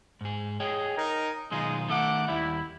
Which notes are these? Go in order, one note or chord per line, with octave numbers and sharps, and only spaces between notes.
G#2 G#4
G#4 C#5 D#5 G5
D#4 A#4
B1 D#3 G#3 D#4 F4 D#6
D#3 A3 A4 E5 F#5 D6
D#2 G3 E4